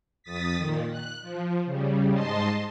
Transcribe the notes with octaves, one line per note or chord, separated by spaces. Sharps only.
F2 D#6 A6 B6
A#2 D#3
F#6
F3
C#3 G3
G#2 D#5 A5 C6